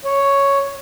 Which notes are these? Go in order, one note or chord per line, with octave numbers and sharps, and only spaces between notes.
C#5